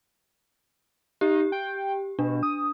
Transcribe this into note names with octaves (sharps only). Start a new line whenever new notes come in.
D#4 G4
G5
B2 D4
D#6